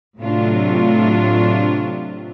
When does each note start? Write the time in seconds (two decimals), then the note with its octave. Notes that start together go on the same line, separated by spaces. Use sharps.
0.18 A2 C3 F#3 A3 D4 F4